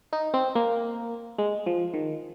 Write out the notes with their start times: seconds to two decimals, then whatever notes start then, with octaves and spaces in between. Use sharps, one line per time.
0.13 D#4
0.34 C4
0.55 A#3
1.39 G#3
1.66 F3
1.94 D#3